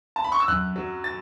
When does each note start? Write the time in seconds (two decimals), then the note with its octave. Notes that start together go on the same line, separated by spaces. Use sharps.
0.16 A5
0.24 B5
0.32 C#6
0.40 E6
0.48 F#2 F#6
0.76 F#3
1.04 A6